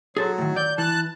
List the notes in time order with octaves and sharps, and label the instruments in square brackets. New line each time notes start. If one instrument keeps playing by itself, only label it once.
[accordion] F#3 [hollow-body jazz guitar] G#4 A4 C5
[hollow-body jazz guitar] A2 D#3
[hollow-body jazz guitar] D5 [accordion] G6
[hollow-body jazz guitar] E3 [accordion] A5 F#6